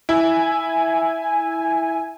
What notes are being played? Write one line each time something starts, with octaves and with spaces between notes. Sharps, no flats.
E4 G#5